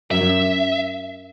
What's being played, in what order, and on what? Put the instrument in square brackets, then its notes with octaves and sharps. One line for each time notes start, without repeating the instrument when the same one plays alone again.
[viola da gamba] F#2 [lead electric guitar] E5